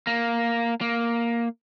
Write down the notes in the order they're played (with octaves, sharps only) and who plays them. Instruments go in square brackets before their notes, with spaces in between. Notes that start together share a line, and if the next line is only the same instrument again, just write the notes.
[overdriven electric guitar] A#3
A#3